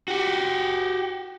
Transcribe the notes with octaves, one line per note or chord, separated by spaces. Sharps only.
F#4 G4